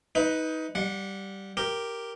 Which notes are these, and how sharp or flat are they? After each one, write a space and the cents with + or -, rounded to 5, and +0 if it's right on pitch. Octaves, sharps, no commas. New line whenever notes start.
D#4 +20 B4 +0
G3 -10 F#5 -20
G4 +0 A#4 +0